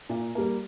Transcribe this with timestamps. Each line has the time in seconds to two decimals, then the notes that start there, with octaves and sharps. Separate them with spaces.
0.09 A#2
0.35 G3 A#3